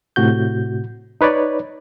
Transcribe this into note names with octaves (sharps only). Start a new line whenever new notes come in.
A2 C3 F#4 G6
D#4 B4 C#5 D5